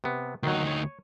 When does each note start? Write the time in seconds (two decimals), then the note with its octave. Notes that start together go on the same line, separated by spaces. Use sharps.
0.04 C3 B3
0.43 D2 D#3 F#3 D#4
0.67 C#5